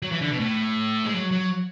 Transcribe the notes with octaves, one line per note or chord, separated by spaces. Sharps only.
F#3
E3
D3
B2
A2
G#3
F#3
F#3